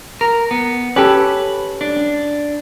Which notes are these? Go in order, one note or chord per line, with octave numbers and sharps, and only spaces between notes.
A#4
B3
C#4 G4 A4 B4
D4